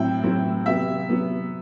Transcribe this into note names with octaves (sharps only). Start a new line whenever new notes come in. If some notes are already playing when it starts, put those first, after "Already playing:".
Already playing: A2 F#3 C4 E4 G5
A2 F#3 C4 E4
C3 F#3 B3 E5
C3 F#3 B3